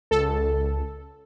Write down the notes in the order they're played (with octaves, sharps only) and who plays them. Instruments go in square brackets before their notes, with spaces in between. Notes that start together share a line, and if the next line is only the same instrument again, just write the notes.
[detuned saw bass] C#2 [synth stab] A4